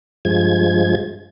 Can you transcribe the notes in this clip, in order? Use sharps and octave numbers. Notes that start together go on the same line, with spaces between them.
G2 F3 G#3 G#6